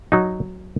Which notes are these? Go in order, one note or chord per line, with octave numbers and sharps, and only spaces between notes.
F#3 D#4